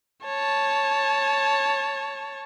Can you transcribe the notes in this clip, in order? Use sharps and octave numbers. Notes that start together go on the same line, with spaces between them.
C#5 A5